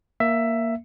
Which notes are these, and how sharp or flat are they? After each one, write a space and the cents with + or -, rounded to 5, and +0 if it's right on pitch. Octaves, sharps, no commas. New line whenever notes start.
A#3 +0 E5 +10